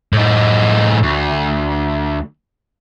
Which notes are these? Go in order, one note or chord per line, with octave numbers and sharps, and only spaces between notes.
A2 D#4
D2